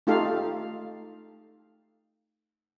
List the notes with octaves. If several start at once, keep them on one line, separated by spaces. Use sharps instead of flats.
A3 D#4 F4 G4 A4 F5